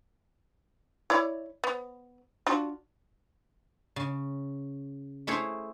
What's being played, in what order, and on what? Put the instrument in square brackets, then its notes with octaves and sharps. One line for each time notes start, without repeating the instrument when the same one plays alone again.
[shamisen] E4 C#5 D5
B3
D4 F4 F#4
[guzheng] C#3
A3 E4 G#4 C5 C#5